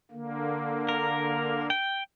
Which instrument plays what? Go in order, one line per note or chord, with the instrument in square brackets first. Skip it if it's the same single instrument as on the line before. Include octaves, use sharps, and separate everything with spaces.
[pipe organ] D3 A#3
[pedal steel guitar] A#4
G5